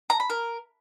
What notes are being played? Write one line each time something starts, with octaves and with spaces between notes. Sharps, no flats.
A#5
B5
A#4